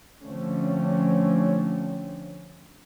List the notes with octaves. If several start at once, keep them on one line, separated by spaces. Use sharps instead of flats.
D3 F3 A3 C4 C#4